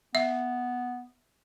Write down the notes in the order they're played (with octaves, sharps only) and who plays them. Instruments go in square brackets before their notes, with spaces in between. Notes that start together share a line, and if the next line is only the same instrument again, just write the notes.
[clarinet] B3 [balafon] E5